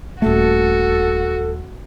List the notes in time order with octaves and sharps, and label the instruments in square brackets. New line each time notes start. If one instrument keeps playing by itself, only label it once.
[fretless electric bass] D#1 A3 [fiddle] F#4 [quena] A4